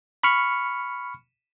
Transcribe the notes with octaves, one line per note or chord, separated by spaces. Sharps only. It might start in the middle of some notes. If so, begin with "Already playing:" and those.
B5 C#6 F6 C#7